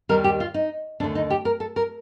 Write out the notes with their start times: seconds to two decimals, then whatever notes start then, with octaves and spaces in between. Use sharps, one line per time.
0.09 D#2 D#3 G3 A#4
0.24 G4
0.40 F4
0.54 D#4
1.00 D#2 D4
1.03 D3 A3
1.15 D#4
1.30 G4
1.45 A#4
1.60 A4
1.76 A#4